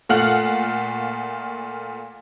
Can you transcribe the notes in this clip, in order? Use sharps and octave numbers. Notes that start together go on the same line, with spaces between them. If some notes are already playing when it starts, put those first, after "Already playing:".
A#2 A3 F5 F#5 F6 F#7